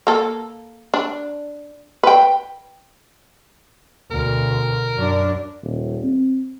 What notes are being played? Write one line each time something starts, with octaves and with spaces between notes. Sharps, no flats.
A#3 A4
D4
B4 G5
D2 B2 A#4
F#2 D4
D#1
C4